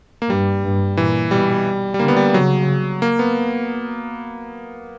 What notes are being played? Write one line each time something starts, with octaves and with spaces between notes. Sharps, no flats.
A#3
G2 G3
G2
A#2 E3
B2 G3
G3
D3 A#3
B3
G3
C#3 F#3
A#3
B3